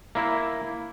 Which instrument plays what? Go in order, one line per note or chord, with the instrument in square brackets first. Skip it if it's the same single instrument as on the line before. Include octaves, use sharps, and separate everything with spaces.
[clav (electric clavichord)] A#3 E4